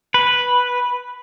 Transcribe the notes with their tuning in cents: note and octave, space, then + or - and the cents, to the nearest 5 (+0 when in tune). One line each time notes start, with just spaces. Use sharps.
B4 -5